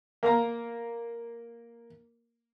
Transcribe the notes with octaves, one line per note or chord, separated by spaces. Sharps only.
A#3 F5 A#5